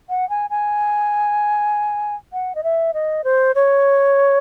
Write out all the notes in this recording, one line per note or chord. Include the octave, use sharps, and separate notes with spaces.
F#5
G#5
G#5
F#5
D#5
E5
D#5
C5
C#5